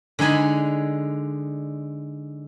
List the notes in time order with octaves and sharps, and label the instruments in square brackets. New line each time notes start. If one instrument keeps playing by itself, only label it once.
[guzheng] D3 G#3 D#4 G#5 B5